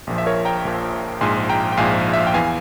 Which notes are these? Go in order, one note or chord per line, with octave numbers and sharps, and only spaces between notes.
A#1 A#2 F3
E5
A#4 C#5
G5 A#5
A#1 A#2 F3
A#1 G#2 F3 G#5 C6
G5 A#5
G5
A#1 G#2 F3 F5 G#5
E5
F5
G5
E2 E3 F5 G#5